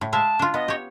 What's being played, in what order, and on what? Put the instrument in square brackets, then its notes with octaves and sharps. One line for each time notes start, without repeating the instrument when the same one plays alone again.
[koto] A2
[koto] G#3 E5 F5 [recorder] A5
[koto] D4 F4
[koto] B3 [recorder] D#5
[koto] G4 C#5